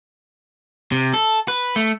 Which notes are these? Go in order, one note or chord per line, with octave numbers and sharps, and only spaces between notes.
C3
A4
B4
A3